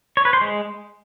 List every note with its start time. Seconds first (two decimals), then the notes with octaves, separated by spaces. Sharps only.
0.17 C#5
0.25 B4
0.33 C5
0.41 G#3